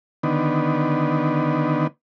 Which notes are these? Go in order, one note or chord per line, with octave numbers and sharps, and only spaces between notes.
D3 D#3 B3